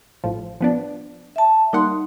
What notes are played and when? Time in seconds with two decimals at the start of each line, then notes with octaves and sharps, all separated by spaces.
0.24 A1 F3
0.61 F3 B3 D4
1.36 E5 A5
1.73 G3 A#3 D#4 F#5 C6